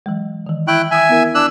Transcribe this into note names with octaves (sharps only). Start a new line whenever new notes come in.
E3 F#3 G#3
D#3 E3
E4 G5 C#6 F#6
E5 G#5 D#6 E6
B3 E4 A#4
D4 E6 F#6